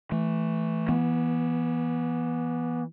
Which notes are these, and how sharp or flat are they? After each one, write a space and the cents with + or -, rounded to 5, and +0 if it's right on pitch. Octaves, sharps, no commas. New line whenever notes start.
E3 +0 A3 +0
E3 +0 B3 -30